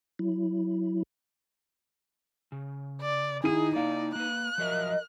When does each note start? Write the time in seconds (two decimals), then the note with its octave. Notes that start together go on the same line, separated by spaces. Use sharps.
0.19 F#3 E4
2.52 C#3
3.01 D5
3.44 D#3 D#4 E4 G#4 D#7
3.76 A#3 E4 D5 F5
4.15 A#3 B4 F#6
4.58 F3 F#3 A#4 D#5 E5